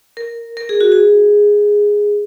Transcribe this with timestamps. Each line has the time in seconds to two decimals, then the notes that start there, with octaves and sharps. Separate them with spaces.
0.17 A#4
0.57 A#4
0.69 G#4
0.81 F#4
0.92 G#4